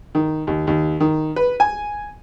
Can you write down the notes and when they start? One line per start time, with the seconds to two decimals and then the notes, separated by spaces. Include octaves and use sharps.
0.15 D#3
0.47 D#2
0.67 D#2
1.00 D#3
1.36 B4
1.60 G#5